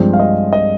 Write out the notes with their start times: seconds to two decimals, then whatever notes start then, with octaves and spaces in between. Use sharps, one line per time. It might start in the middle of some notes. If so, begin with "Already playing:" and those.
Already playing: G2 F3 G#3 C4
0.13 F5
0.20 D#5
0.53 D#5